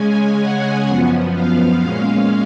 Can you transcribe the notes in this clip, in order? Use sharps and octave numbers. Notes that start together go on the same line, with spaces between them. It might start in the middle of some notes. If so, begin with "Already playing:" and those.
Already playing: C#3 G#3 C#4 G#5
F#5
F#2 F3 B3
F5
A#2 G#3 C#4 F5